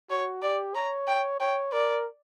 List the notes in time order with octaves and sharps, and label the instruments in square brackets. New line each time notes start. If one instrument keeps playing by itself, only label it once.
[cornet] F#4 [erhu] C#5
[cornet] G4 [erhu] D5
[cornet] C#5 [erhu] A#5
[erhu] G5
[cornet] C#5 [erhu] G5
[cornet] A#4 [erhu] D5